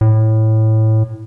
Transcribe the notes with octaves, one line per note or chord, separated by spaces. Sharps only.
A2